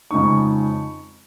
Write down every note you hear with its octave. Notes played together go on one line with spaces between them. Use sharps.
F2 C#3 G#3 D#4 C#6